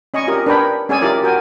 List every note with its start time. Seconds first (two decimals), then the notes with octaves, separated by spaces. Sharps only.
0.14 C#4 D#5 G#5 C#6
0.27 F4 G4 A#4 D#5
0.46 D4 A#4 B4 C#5 G5 B5
0.89 C#4 G#4 C#5 D5 G#5 E6
1.01 E4 F4 G4 A#4 D5
1.23 F#4 A#4 G5 G#5